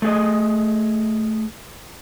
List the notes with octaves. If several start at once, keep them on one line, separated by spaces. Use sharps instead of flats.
A3 G#4 D#5